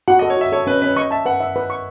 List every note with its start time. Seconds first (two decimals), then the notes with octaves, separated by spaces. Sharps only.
0.08 F#4 F#5
0.19 D#5
0.22 A4
0.30 C#5
0.37 F#4 E5
0.52 A4 C#5
0.67 C#4 B4
0.82 C#4 B4
0.96 D#5 C#6
1.11 E5 A5
1.26 B4 F#5
1.40 E5
1.56 B4
1.70 C#6